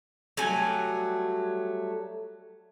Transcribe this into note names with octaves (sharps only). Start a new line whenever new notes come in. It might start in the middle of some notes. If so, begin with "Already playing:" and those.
F#3 G3 A3 G#5